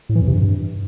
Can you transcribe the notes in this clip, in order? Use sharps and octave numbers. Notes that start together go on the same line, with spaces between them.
A2
E3
F2
C3
G2